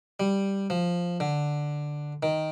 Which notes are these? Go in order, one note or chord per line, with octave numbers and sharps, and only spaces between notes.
G3
F3
D3
D#3